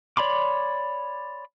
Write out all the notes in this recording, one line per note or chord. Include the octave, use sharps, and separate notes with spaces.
C#5 D5 B5 C6 D6